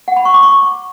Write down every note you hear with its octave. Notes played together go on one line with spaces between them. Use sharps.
F#5
B5
C#6
D6
C#6